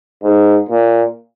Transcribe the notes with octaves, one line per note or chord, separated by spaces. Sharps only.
G#2
A#2